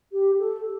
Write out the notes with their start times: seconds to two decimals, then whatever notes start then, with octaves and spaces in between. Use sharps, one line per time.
0.12 G4
0.39 A4